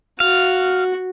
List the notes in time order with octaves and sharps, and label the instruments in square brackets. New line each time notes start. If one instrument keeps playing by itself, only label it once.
[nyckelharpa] F#4 [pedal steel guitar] F5